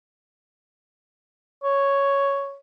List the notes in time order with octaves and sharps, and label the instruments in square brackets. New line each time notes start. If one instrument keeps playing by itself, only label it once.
[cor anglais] C#5